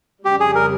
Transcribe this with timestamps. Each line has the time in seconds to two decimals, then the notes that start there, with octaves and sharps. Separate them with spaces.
0.25 F2 C#3 G3 G4
0.40 G#4
0.55 A#4